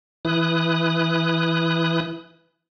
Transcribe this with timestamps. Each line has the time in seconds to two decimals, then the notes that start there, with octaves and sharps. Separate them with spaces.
0.25 E3 E4 D#6 F#6